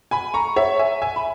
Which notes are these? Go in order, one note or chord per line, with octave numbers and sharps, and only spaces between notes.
G#5 B5
A#5 C#6
C#5 E5
E5 G#5
E5 G#5
B5